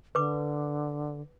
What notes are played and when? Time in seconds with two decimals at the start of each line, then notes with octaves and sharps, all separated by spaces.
0.15 D3 B4 D6